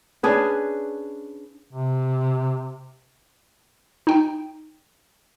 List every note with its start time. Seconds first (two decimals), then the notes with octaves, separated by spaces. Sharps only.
0.23 C#4 D4 G#4 B4
1.71 C3
4.07 D#4 G5